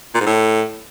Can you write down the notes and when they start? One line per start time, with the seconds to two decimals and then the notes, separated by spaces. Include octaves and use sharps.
0.15 A#2
0.20 G#2
0.26 A2